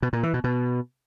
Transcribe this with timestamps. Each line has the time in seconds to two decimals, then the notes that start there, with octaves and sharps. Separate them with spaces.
0.02 B2
0.13 A#2
0.23 E3
0.34 B2
0.44 B2